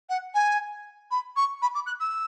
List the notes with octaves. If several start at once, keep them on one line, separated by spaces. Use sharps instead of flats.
F#5
G#5
B5
C#6
B5
D6
F#6
E6